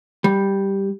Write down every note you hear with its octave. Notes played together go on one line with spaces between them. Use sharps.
G3